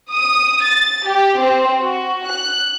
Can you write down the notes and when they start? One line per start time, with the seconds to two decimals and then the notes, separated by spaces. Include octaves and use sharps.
0.13 D#6
0.64 A6
1.08 G4
1.40 C4
1.82 F#4
2.30 F#6